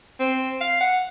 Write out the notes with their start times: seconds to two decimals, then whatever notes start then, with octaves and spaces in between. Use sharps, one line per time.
0.20 C4
0.61 F5
0.80 F#5